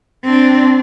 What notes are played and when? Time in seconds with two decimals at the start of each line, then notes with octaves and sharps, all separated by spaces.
0.24 C4 D4